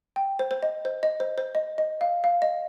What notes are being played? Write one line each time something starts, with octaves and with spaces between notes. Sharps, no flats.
G5
C5
C5
D#5
C5
D#5
C5
C5
D#5
D#5
F5
F5
D#5